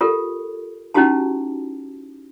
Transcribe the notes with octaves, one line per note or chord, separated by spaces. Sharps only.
F4 G4 A4 A#4
C#4 D#4 E4 F#4 G4 A5